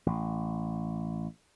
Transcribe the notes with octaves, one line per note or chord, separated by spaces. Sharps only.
A1